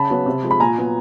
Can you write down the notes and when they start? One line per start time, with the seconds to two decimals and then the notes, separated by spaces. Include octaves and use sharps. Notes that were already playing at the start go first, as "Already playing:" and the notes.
Already playing: C#3 A5 B5
0.10 F#3 B3
0.26 C3
0.43 F3 G#3
0.51 B5
0.60 A#2 G#5 A#5
0.77 F#3 B3